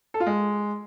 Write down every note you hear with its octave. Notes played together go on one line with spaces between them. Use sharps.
A4
F4
G#3